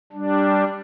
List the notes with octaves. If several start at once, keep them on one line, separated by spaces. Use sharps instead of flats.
G3 D4